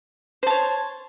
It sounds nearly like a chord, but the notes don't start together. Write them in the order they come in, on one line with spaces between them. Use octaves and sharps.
C5 A5 C#5